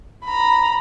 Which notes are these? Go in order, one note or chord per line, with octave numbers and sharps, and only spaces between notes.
A#5 B5